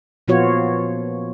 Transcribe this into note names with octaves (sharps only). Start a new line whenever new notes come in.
A#2 F3 B3 F4 F#4 C#5